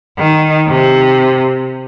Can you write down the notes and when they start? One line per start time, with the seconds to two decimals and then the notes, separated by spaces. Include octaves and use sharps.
0.18 D#3
0.68 C3